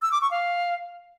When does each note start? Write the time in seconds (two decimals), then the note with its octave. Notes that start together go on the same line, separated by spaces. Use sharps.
0.02 E6
0.12 D6
0.21 C#6
0.31 F5